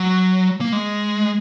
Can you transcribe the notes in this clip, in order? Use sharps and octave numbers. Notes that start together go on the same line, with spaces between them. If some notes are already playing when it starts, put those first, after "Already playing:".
Already playing: F#3
A#3
G#3